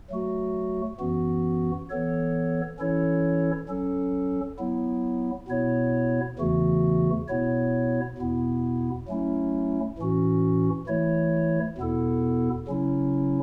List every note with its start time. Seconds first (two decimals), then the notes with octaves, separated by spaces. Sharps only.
0.10 F#3 A3 F#4
0.99 F#2 E3 B3 F#4
1.90 E3 B3 A4 C#5
2.79 E3 C#4 E4 A4 C#5
3.69 F#3 C#4 A4
4.58 F#3 B3 E4
5.48 B2 B3 E4 C#5
6.39 E2 C#3 E3 A3 F#4
7.28 B2 B3 E4 C#5
8.18 E2 B2 B3 E4
9.08 F#3 A3 C#4 E4
9.98 A2 E3 C#4 F#4
10.87 E3 A3 E4 C#5
11.78 E2 B2 B3 E4 A4
12.67 C#3 F#3 C#4 E4